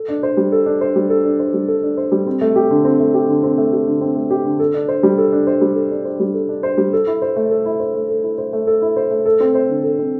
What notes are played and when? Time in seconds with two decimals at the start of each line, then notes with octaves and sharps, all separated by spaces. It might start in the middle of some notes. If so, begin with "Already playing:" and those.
Already playing: A4
0.08 D4
0.23 C5
0.37 G3
0.52 A4
0.66 D4
0.81 C5
0.96 G3
1.10 A4
1.25 D4
1.39 C5
1.54 G3
1.68 A4
1.83 D4
1.97 C5
2.12 G3
2.27 C4
2.41 A3
2.56 G4
2.71 D3
2.85 C4
3.00 A3
3.14 G4
3.28 D3
3.43 C4
3.58 A3
3.73 G4
3.87 D3
4.01 C4
4.16 A3
4.30 G4
4.45 D3
4.59 A4
4.74 D4
4.88 C5
5.03 G3
5.18 A4
5.32 D4
5.47 C5
5.61 G3
5.76 A4
5.91 D4
6.05 C5
6.20 G3
6.34 A4
6.49 D4
6.63 C5
6.78 G3
6.93 A4
7.07 E4
7.22 C5
7.36 A3
7.51 A4
7.66 E4
7.80 C5
7.94 A3
8.09 A4
8.24 E4
8.38 C5
8.53 A3
8.67 A4
8.82 E4
8.96 C5
9.11 A3
9.26 A4
9.40 C4
9.55 C5
9.69 D3
9.84 A4
9.99 C4